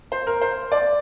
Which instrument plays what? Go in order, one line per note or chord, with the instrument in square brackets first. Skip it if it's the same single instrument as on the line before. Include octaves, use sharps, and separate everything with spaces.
[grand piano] C5
A#4
C5
D5